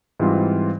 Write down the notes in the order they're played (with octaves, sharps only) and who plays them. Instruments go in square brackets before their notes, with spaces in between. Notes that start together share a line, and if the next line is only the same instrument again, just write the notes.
[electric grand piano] G#2 E3 G3 C4 F4